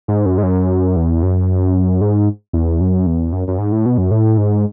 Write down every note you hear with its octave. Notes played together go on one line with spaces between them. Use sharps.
G#2
F#2
G#2
F#2
E2
F#2
G#2
E2
F#2
E2
F#2
F#2
G#2
A2
B2
F#2
A2
G#2